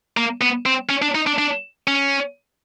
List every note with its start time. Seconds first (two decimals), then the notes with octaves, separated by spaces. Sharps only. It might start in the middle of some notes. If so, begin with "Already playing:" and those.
0.17 A#3
0.41 B3
0.66 C4
0.90 C#4
1.02 D4
1.15 D#4
1.27 D4
1.39 D4
1.87 C#4